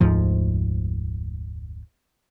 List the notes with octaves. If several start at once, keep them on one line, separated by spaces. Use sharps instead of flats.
F1 D2 G#2 F3